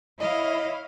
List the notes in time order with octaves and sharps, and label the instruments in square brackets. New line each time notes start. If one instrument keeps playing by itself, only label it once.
[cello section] E4 C#5 F5 [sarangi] D#5